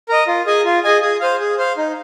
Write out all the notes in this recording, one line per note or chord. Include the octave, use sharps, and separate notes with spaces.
A#4 D#5
F4
G#4 D#5 G#5
F4
G#4 D#5 G#5
G#4
C5 F5
G#4
C5 F5
D#4